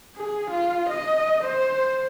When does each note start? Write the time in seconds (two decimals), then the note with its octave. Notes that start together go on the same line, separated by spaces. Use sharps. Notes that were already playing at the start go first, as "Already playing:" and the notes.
0.16 G#4
0.50 F4
0.89 D#5
1.44 C5